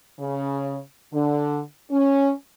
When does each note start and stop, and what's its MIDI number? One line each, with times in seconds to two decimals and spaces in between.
0.19 0.78 49
1.13 1.60 50
1.91 2.32 61